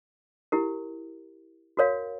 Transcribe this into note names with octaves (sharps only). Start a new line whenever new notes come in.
E4 G4 A#4
F#4 A#4 C#5 F5